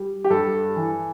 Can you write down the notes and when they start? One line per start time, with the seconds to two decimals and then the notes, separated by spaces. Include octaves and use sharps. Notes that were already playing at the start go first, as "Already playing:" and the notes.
Already playing: G3
0.24 G4
0.30 G2 A4
0.76 E3